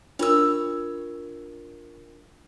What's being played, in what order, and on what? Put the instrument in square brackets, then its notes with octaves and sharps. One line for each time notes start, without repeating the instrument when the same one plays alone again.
[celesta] D4 F4 A#4 [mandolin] C#5 E6